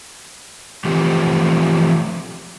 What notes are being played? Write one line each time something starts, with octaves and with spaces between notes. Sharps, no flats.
E3 F3 A3 C4 G4